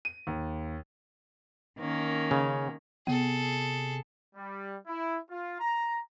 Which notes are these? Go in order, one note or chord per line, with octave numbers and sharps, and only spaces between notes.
D#7
D#2
D#3 A#3 C#4
C#3
C3 B3 G#4 A4
G3
E4
F4
A#5